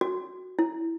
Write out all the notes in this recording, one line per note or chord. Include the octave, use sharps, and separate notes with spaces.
F#4
E4